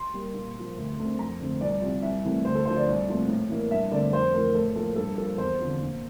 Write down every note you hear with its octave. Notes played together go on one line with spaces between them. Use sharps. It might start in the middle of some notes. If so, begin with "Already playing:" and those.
Already playing: C6
G3 A#3
A#2
F3 A#3
D2
D3 A3 C4
F2 A#5
D3 A3 C4
C2 D5
C3 F3
C2 E5
C3 E3 A3
D2 C5
A4
D3 F3 C5
D5
C2
A#2 F3 A3 C4
A2
E3 A#3
G2 E5
D3 A3 C4 D5
F2 C5
E3 A3 A#4
A2 A4
F3 A#3 A4
G2 A4
F3 A#3 A4
E2 C5
D3 F3 C4
A#2